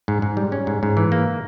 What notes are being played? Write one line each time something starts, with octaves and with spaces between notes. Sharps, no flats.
G#2
G#2
G3
C#4
G#2
G#2
E3
A#3